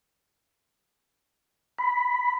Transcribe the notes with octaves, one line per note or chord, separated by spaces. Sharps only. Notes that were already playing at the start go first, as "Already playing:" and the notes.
B5